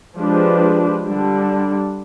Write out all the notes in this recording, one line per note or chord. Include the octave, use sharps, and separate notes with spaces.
F3 G#3 D4 G4 B4
D3 G3 D4